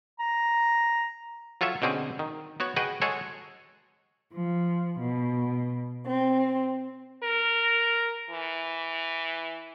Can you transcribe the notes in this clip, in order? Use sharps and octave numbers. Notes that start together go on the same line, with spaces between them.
A#5
F#3 F4 A4 C#5 E5
B2 D3 C4 C#4 G#4
D#3
B3 F#4 C#5
F#4 G#4 B4 D#5 G5
G#3 F#4 G#4 A4 C#5
F3
B2
C4
A#4
E3